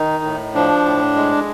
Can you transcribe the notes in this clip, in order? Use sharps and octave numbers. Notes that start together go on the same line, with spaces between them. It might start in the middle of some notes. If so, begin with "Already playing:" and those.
Already playing: D#3 D#4
A2
F3 D4
A2
G#3